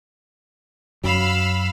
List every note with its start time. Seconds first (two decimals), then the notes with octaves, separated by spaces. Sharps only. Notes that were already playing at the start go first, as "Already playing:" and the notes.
1.04 F#2 F#3 F5 B5 E6